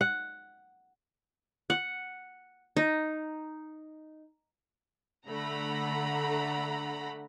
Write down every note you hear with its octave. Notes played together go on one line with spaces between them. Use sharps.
F#5
F#5
D#4
D3 A3 F#5 A#5 B5